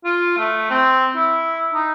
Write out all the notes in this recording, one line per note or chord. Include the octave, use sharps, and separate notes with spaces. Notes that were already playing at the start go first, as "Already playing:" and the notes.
F4
A3
C4
E4
D#4